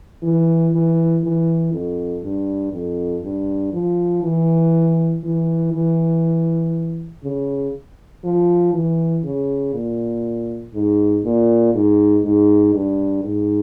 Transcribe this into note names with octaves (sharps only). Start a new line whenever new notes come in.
E3
E3
E3
F2
G2
F2
G2
F3
E3
E3
E3
C#3
F3
E3
C#3
A#2
G#2
A#2
G#2
G#2
G2
G#2